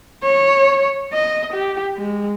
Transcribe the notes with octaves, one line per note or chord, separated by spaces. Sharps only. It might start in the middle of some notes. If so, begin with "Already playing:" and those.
C#5
D#5
G4
G#3